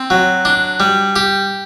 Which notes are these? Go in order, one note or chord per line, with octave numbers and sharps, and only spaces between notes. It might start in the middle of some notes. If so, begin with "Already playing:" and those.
Already playing: C4
F#3
D4
G3
G4